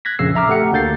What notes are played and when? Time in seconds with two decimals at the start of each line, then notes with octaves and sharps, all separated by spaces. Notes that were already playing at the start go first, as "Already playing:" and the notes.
0.05 F#6 G#6 A#6 B6
0.19 A#1 F2 C#3 E6 C7
0.35 E5 A#5 D6 F6
0.49 A3 G4 F#5 C#7
0.72 D2 A#3 D4 G6 A6 C7